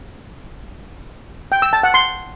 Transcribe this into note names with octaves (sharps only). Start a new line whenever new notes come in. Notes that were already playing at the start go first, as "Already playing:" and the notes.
G5
E6
A5
F#5
C6